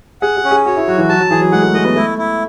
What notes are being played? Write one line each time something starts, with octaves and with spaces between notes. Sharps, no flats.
G#4 F#5
G#4
C#4
G#4
F#4 C#5
E4
F#3 F#4
E3
F#3 A5
F#3
E3 G#4
F#3
G#3 F#5
A3
A3 D#5
B3
A3 E4
E4